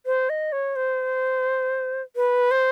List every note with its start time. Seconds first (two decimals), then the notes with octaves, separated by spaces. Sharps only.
0.06 C5
0.30 D#5
0.52 C#5
0.76 C5
2.16 B4
2.51 C5